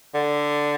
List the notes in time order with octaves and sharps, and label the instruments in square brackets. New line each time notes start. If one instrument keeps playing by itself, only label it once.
[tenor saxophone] D3